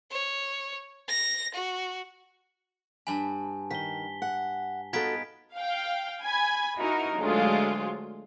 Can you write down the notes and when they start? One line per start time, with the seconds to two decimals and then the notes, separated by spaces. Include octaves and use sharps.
0.11 C#5
1.08 A#6
1.54 F#4
3.07 G2 G#5 A5 B5
3.71 D#3 B6 G7
4.22 F#5
4.93 B3 D#4 F4 F#4 A4 G#6 B6 D7
5.56 F5 G5
6.24 G#5 B5 G#6
6.77 D#4 E4 F#4 A#4
7.17 D2 F#3 G#3 F4